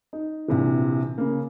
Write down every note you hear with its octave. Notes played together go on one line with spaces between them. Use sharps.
D#4
A#1 C3 E3
C#3 A#3